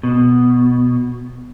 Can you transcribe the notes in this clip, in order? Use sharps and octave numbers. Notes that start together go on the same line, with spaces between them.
B2